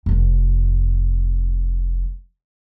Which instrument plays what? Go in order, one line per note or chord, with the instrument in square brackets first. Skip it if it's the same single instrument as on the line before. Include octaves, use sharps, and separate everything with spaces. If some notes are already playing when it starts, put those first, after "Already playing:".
[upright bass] F1 F2